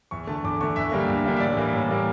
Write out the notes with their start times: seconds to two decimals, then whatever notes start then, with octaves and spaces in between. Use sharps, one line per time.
0.11 E2 C#6
0.27 D3 A3 A5
0.44 E2 D6
0.61 D3 A3 C#6
0.76 E2 E5
0.92 D3 G3 A#3
1.08 E2
1.25 D3 G3 A#3
1.37 E5
1.40 A2 D5
1.57 E3 G3 A#3
1.73 A2
1.89 E3 G3 A#3